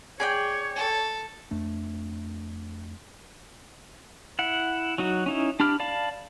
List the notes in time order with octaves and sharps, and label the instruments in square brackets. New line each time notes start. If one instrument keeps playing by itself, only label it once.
[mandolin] G#4 D5 G5 [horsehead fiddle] C#5
[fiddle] A4
[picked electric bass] F2 A3 D4
[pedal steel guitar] E4 F#5
F#3 D#4 F#4
C#4 D#4 E4
D4 G4 B5 F6
D5 F5 A5 B5